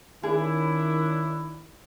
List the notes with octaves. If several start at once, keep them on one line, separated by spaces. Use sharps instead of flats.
D#3 C#4 D4 E4 G#4